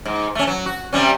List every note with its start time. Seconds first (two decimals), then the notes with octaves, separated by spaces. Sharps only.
0.05 G#2
0.35 A3 C#4
0.47 F#3
0.66 F#4
0.93 C3 G3 C#4